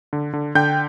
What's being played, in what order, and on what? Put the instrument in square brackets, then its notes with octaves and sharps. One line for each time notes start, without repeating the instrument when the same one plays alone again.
[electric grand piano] D3
D3
D3 G5 G6